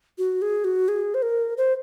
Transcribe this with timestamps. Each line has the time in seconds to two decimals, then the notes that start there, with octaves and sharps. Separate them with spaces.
0.18 F#4
0.42 G#4
0.64 F#4
0.88 G#4
1.14 C5
1.22 A#4
1.57 C5